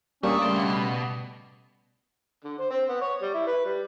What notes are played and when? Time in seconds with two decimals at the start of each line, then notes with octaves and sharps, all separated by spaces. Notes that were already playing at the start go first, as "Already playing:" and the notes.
0.23 G3 A3 A#3 C#4 D4 D6 D#6
0.42 C#3 G3 A3 A4 C5 D6
0.56 B2
2.44 D3
2.59 C5
2.70 C4
2.89 B3
3.01 C#5
3.22 G3
3.34 E4
3.47 B4
3.65 G3